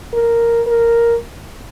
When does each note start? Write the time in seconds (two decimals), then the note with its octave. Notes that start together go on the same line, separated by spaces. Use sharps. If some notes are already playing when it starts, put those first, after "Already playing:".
0.13 A#4
0.67 A#4